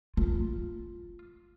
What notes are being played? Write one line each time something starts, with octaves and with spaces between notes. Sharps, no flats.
F4